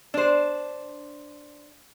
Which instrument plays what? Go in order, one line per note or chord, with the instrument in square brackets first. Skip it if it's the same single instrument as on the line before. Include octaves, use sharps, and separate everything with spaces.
[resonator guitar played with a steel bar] D4 C5